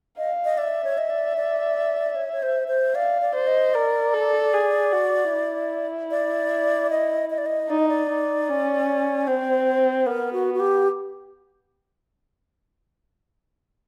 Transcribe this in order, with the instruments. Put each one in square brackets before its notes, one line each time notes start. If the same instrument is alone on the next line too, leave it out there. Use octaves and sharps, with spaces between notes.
[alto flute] D#5 [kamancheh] F5
[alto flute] D#5
[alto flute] D5 [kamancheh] E5
[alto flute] C#5
D#5
D5
D5
C#5
C#5
C5
C5
[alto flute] D5 [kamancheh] F5
[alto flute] D5
[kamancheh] C5
[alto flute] D#5
[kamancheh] A#4 [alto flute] D5
[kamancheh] A4
G#4
F#4
E4
[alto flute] D5
D#5
D#5
D5
D#5
[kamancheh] D#4 [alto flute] D5
[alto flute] D#5
D5
[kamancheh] D#4
C#4
[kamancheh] C4 [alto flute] C5
[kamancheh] B3 [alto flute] A#4
[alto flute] F#4
F#4
G4